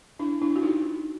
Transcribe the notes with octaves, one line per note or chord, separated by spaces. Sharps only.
D4 E4
D4 E4
F#4
D#4 F4